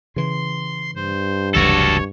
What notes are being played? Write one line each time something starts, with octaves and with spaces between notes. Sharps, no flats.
C#3 E3 C6
G2 C5
F1 C#2 E3 F#4 A4 C#5